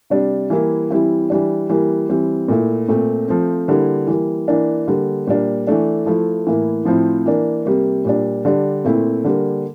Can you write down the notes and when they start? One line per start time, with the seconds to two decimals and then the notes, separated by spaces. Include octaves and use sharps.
0.10 C3 G3 D4
0.50 E3 G3 A#3 E4
0.90 E3 G3 C4 E4
1.30 E3 G3 D4
1.69 E3 G3 A#3
2.09 E3 G3 C4
2.48 A#2 A3 E4
2.89 A#2 A3 C4
3.28 F3 A3 C4
3.68 D3 G3 A#3 E4
4.07 E3 G3 A#3
4.48 E3 A#3 D4
4.88 D3 G3 A#3
5.27 A#2 G3 A#3 D4
5.67 E3 A3 D4
6.06 F3 A3 E4
6.47 A2 E3 A#3 E4
6.85 A2 F3 C4 E4
7.26 E3 A#3 D4
7.65 C3 G3 A#3
8.05 A#2 G3 D4
8.45 D3 G3 D4
8.85 A#2 A3 C4 E4
9.24 D3 G3 A#3